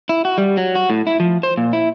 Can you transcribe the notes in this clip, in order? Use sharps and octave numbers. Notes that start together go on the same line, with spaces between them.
E4
F#4
G3
F#3
F#4
A2
E4
F3
C5
A#2
E4